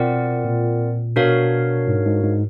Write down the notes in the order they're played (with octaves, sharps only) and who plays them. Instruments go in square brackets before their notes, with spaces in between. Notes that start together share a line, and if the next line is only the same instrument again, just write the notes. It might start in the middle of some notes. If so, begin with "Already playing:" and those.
Already playing: [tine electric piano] B2 [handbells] C4 F4 A#4 D5 F#5
[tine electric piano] A#2
[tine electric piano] B2 [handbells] D4 F#4 A#4 C#5 F5
[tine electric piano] G#2
G#2
G#2